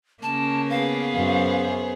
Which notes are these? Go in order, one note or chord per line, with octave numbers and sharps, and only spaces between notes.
C#3 A#3 C#4 A5
B3 G#4 F5
F#2 C5